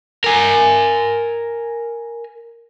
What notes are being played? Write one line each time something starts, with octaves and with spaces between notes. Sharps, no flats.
A#4 G#5